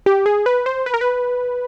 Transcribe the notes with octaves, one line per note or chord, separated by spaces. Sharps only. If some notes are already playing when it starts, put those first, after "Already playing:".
G4
G#4
B4
C5
B4
A#4
B4